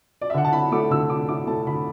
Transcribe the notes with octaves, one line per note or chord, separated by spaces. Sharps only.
D5
E5
D3 F#5
A5
E4 B5
A3 D6
D3 E6
D3 D6
E4 D6
A3 A5
D3 B5